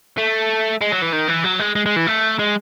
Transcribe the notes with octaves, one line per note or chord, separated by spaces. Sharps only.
A3
G#3
F#3
E3
D#3
E3
F#3
G#3
G#3
G#3
E3
A3
G#3